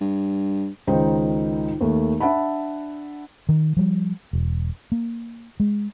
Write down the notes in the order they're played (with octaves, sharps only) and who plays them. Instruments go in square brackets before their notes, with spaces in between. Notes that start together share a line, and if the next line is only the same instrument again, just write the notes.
[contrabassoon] G2
[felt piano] C#2 D#3 D#4 C5 G5
D#2 A3
D4 E5 F#5 A5 B5
[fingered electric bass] D#3
F3 G3
E1
A#3
G#3